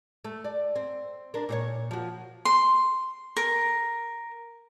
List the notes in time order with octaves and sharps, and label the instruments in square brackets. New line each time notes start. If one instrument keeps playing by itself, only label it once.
[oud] A3
D5
C4
D4 A#4
A#2 C5 C#5
F3 F#4
[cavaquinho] C6
A#4